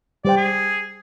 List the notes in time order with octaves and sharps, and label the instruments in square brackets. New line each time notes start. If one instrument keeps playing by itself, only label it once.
[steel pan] G3 C5 G5 [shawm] D5
[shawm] G#4